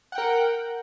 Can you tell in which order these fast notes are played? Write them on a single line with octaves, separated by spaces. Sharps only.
F#5 G5 A#4